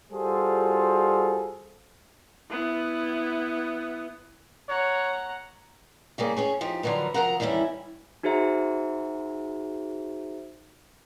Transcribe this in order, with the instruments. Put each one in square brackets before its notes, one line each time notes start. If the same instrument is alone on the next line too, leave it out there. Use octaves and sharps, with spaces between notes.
[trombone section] G3 F4 F#4 G#4 A4 C5
[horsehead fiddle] B3 E4
[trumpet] C#5 [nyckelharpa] F#5 A#5
[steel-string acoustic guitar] C#3 G3 A#3 G#4
C#4 G#4 C#5
F3 D#4 G4
D3 F3 F#3 B3 A#4
F3 F#3 A#4 F#5 A#5
E2 D#3 G3 C#4 E4
[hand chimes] D#4 F#4 G#4 C5 E5 A#5